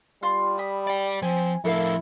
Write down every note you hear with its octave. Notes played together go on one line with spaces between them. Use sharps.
G3 F4 C6
B5 D#6
D5 G5
F3 C4 G#5
A2 F3 E4 A4 A#4 F5